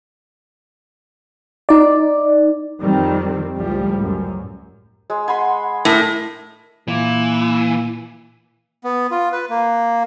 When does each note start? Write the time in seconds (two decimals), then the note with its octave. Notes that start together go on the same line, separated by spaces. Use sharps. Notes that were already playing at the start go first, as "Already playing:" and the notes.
1.69 D#4 D5
2.81 F2 D#3 G3 C4
3.57 C#2 A2 F3 G3
4.04 F#2
5.10 G#3
5.28 F#5 G#5 B5 C6
5.85 A2 A#4
6.88 A#2 E3 A#3
8.84 B3
9.11 F4
9.32 B4
9.50 A#3